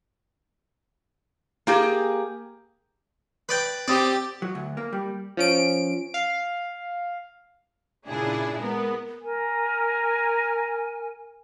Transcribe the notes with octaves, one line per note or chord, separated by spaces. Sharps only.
A#3 G4 G#4
B4 D5 G5
C4 G4 D5 D#6
F#3
D2
A#3
G3
F3 C#4 D7
F5
A#2 C#3 D4 E4 G#4
G#3 B3 A#4
A#4 G#5